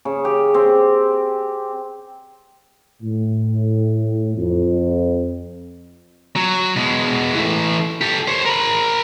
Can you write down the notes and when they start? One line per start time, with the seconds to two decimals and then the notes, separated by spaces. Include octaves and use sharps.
0.05 C#3
0.25 G4
0.54 C4
3.02 A2
4.37 F2
6.36 F#3
6.76 B2 G#3
7.35 E3 A3
8.01 G4 A4
8.28 C5 C#5
8.45 A#4 B5